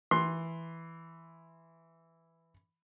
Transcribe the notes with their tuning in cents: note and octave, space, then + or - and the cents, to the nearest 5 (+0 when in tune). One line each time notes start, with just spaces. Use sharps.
E3 +0 C6 +10